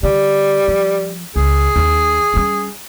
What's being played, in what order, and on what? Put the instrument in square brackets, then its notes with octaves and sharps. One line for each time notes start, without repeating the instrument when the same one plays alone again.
[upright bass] D3 [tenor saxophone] G3
[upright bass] F3
[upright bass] C#2 [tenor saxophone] G#4
[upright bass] D#2
G3 C#4